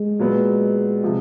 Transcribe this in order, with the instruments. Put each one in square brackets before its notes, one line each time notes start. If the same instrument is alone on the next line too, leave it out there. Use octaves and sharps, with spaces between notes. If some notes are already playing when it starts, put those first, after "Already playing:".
Already playing: [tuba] G#3
[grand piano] A#2 F#3 B3
C3 F3